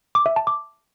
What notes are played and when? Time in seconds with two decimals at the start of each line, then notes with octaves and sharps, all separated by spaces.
0.15 D6
0.26 E5
0.36 A5
0.47 D6